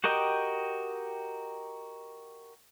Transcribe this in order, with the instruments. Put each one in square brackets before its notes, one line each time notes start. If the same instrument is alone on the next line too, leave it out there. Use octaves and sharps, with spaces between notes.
[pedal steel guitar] F#4 G4 A#4 D#5 G5